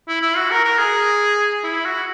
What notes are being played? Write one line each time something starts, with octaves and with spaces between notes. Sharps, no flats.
E4
E4
F#4
A#4
A#4
G#4
E4
F#4